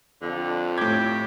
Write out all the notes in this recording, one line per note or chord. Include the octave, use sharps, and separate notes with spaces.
F2 D3
A2 G4 G#6